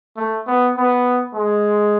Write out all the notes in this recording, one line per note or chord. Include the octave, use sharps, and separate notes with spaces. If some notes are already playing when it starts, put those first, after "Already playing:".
A3
B3
B3
G#3